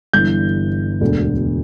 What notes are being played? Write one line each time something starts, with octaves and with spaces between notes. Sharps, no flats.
G1 G2 E3 G6
E1 D2 D3